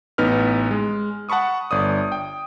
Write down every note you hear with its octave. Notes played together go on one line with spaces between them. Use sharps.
A1 B3 D#4 B4 F6
G#3
F#5 A5 B5 C#6 D#6
G1 D5 D#6
G5